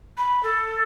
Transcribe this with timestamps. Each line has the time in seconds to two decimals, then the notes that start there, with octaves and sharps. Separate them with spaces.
0.17 B5
0.43 A4